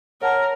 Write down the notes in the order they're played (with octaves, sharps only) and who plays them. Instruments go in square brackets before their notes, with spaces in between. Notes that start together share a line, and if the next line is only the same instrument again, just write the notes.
[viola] A#4 [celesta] C#5 F#5 A5